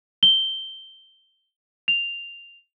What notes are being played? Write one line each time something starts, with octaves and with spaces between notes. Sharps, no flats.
G7
F7